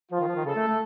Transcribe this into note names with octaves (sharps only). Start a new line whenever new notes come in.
F3 F4
D#3
F3
D#3
C#3 A4
A3
A3